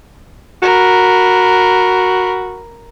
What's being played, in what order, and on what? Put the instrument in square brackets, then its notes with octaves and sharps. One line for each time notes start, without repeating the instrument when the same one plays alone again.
[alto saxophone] F#4 [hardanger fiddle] A#4 B5